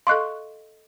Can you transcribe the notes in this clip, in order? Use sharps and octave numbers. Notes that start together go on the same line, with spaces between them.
A4 D#5 F5 C6 C#6 F#6